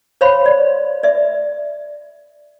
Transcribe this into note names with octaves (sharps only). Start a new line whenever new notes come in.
C5 C#5 F5 B5 C6
D5
D5 E5